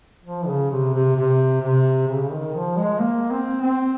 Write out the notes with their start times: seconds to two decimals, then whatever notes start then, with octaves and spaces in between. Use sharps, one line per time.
0.25 F3
0.47 C#3
0.70 C3
0.94 C3
1.16 C3
1.62 C3
2.08 C#3
2.31 D#3
2.54 F3
2.77 G#3
3.00 A#3
3.31 C4
3.61 C4